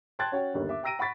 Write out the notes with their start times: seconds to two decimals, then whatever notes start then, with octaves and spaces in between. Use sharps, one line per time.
0.19 G5 A5 C6 F#6 G#6 A6
0.32 C#4 F#4 C#5 G5
0.54 G1 D#2 G3
0.69 E5 D6
0.83 G5 A#5 E6 A#6 D7 D#7
0.99 F#5 B5 C#6 A6 B6